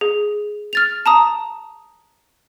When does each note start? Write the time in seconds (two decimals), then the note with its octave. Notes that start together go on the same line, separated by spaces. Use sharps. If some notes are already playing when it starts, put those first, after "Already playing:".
0.01 G#4
0.73 F6 A6 F7
1.06 A5 A#5 D#6